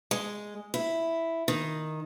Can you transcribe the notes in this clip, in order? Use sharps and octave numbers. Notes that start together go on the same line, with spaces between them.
G#3
E4
D#3